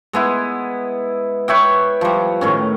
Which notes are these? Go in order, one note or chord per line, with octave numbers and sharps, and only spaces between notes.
G#3 B3 E4
B4 C#5 E5 G5
F3 G3
A2 D#3 C#4